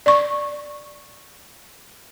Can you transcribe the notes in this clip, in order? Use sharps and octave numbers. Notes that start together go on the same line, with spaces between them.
D5 C#6